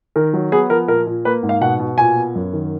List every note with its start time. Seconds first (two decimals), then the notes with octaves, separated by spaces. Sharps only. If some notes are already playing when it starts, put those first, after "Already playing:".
0.16 D#3 A#4
0.33 F#3
0.52 B3 G#4
0.70 F3 A#4
0.88 A#2 A#4
1.06 A#2
1.25 A#3 B4
1.43 G#2
1.49 F5
1.61 B2 F#5
1.79 B2
1.98 A#2 G#5
2.16 B3
2.35 F#2
2.53 D#3